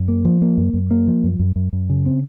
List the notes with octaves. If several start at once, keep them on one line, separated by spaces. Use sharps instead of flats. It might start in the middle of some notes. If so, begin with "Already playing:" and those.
Already playing: F#2
A#3
F3
A#3
F#2
F#2
A#3
F3
F#2
F#2
F#2
F#2
C#3
C4